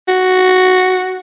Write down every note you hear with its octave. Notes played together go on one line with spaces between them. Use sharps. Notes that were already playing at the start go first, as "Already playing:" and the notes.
F#4